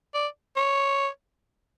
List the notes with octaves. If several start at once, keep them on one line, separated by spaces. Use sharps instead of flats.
D5
C#5